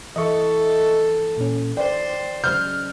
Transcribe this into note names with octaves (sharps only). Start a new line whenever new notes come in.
E3 A4 D#5 E5 C#6
A#2 C#4
C5 D5 G5
C#3 F#3 G#3 F6 G6